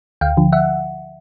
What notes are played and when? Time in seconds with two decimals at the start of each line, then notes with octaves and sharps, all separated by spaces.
0.21 D2 F5 G5
0.37 D3 F3
0.52 E5 F#5